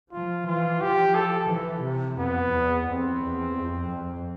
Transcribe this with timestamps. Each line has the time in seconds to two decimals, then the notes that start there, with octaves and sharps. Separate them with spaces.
0.12 F3 F4
0.47 E3 F4
0.81 F3 G4
1.15 A4
1.49 E3
1.83 C3
2.18 F2 B3
2.53 E2
2.87 F2 C4
3.20 E2
3.55 F2
3.89 F2